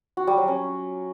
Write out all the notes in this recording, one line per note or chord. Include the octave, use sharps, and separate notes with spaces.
F#4
G3
F#3
C#4